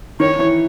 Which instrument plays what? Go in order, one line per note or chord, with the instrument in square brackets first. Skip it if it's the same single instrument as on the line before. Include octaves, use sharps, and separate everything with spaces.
[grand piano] D#3 [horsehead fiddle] C#5
[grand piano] E3